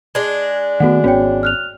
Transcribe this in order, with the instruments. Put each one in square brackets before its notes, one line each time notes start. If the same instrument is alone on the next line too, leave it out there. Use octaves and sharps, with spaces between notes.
[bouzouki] G#3 D4 [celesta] G#6
[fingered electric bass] D#3 A3 B3 [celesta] F#4 A4 F#5
[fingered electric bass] G#1 B3 C#4 [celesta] F#4 C#5 G5
[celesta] F6 F#6 F7